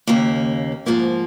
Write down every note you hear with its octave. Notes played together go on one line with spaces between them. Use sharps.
D#2 C#3 A#3
G#2 F3 A#3